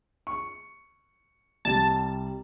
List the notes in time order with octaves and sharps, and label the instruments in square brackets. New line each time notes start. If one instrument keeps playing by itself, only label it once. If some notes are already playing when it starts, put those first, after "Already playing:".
[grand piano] C#6
[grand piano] C2 G3 [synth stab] A5